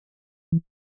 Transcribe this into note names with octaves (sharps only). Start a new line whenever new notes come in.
E3